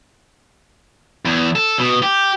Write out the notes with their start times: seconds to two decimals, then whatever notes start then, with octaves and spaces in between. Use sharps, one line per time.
1.25 E2
1.55 A4
1.79 B2
2.03 G4